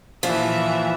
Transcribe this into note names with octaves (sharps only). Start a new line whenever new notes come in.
A#2 E3 F3 E5